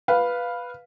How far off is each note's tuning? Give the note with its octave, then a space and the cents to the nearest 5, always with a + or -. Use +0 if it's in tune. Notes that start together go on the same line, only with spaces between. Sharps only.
B4 +0 F5 +0